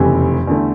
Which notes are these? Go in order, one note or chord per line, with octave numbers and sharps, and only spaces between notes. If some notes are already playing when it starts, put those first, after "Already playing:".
Already playing: F1 E2 C#3 E3 A3 G4
E2 D3 A3